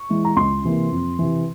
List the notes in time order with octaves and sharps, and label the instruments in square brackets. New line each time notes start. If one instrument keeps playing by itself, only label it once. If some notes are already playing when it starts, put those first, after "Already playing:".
Already playing: [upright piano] C#6
E3 G#3 E4
A#5
C#2 C6
C3 E3 A#3
F2
C3 E3